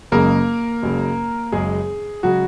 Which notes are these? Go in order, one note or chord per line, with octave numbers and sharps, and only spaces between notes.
F#1 F#2 C#3 G#3 A#3 A#4
F#1 F#2 C#3 G#3
F#1 F#2 C#3 G#3 G#4
C#3 F#3 G#3 F#4